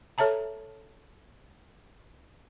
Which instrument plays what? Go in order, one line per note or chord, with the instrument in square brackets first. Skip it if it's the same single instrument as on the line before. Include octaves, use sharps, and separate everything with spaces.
[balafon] A4 C#5 E5 A5 A#5